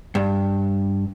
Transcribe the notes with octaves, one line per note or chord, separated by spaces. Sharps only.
G2